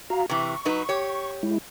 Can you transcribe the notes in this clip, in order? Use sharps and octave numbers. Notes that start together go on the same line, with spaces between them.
F#4 F5 A#5
C3 E3 C#6
F#3 D#4 B4
G4 C#5
G#3 E4